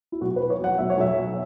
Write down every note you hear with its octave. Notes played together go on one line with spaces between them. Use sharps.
E4
B1 F#4
B4
B2
C#5
F#3 F#5
B1 E5
C#5
B1 E5
B2